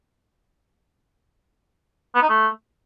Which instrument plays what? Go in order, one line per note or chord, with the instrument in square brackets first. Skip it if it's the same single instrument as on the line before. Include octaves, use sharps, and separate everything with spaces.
[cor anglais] B3
D#4
A3